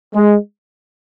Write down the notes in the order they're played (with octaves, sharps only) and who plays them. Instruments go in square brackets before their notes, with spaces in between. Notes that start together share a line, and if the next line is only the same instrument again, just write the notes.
[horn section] G#3